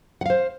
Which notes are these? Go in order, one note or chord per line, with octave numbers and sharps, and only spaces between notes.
C5 F5 F#5